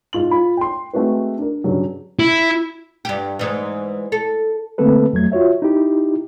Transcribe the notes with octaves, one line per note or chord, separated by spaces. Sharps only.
G#2 F4 F#7
F4 B5
G5 C6
G#3 A3 C4 F#4 B4
D4 A#4
G2 C#3 F#3
E4
G2 G4
G#2 E3
A4
D3 A3 A#3 C4 A4 B4
F2 F#3 A3 G#6
F4 F#4 C#5 E5
D#4 E4 G4